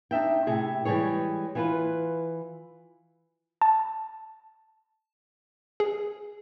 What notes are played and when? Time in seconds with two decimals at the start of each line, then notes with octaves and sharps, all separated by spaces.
0.11 D4 D#4 E5 G5
0.47 A2 C3 G#4
0.85 E3 G3 G#3 G#4 C#5
1.55 E3 F4 B4
3.62 A5
5.80 G#4